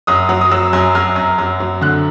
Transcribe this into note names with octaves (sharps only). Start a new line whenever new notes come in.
F#2 D#6
F#3
D#6
F#3 E6
F#2
F#2 F6
F#2
F#2
F#3
D3 F#6